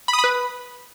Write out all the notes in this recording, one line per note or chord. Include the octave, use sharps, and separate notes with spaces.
B5
D#6
B5
B4